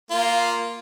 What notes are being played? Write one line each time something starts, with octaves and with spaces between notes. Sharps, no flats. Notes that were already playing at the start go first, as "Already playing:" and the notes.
A#3 F4